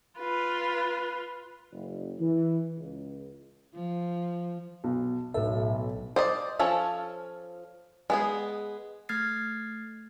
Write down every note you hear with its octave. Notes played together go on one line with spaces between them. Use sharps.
F4 B4
F#1
E3
C#2
F3
B1
B1 A2 A4 E5
C5 D5 D#5
F3 C#4 F4 A4 C#5
G#3 B3 G#4
A3 F6 G#6 A6 C7